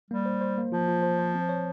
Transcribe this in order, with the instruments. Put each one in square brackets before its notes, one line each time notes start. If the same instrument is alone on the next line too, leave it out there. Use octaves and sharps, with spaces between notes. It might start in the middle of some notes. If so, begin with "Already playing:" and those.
[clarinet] G3 [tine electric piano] A#3
[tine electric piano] C5
C5
A#3
[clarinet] F3 [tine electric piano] F4
[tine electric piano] F4
C5
C5
C4
C#5